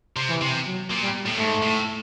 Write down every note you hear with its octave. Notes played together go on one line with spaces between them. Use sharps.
C3
E3
C3
F#3
A#2
G3
A2
G#2 A3
A2